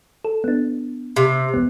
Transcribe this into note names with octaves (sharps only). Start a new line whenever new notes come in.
A4
B3 D4
C3
E2 B3